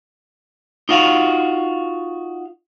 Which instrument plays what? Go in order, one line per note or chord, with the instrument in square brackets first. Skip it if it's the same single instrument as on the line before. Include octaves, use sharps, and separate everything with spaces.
[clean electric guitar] D#4 F4 F#4 F5